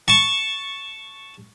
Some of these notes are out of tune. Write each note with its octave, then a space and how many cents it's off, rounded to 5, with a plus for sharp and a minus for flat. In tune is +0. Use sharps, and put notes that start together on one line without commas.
A5 +0 C#6 +0